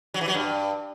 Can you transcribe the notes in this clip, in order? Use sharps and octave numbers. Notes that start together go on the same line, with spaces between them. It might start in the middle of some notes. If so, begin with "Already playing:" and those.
F#3
E3
F#3
G2